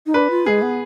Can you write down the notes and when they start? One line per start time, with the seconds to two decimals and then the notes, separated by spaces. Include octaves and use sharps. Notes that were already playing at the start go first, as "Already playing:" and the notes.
0.06 D#4
0.14 D4 B4
0.30 F4
0.46 G#3 G#4
0.62 B3